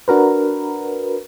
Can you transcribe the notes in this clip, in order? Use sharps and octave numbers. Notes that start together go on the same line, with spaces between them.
D4 F#4 A#4 B4